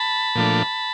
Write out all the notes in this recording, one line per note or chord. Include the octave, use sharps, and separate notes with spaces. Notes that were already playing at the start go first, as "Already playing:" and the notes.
Already playing: A5 B5
A#2 F3 A3 D4